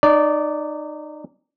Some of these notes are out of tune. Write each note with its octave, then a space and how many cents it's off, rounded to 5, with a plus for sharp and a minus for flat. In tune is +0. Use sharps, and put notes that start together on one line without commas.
D#4 -30 D5 -15